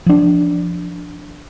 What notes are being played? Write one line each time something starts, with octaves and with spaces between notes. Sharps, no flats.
F3 D4